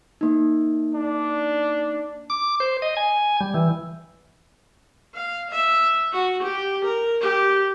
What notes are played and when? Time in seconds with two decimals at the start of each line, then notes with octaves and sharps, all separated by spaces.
0.21 A#3 D#4
0.94 D4
2.30 D6
2.60 C5
2.82 D#5
2.97 G#5
3.40 G3
3.54 E3
5.14 F5
5.51 E5
6.13 F#4
6.42 G4
6.85 A#4
7.21 G4